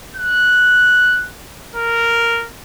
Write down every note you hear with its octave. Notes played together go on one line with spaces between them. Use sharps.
F#6
A#4